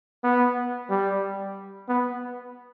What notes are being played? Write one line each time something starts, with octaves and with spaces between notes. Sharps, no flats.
B3
G3
B3